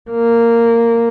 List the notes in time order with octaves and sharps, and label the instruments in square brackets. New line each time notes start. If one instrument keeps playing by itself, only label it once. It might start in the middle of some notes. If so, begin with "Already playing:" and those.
[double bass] A#3